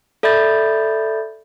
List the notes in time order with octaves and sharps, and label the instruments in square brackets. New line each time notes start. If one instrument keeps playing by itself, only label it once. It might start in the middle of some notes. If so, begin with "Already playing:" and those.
[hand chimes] A4 D5 E5 B5 G6 A6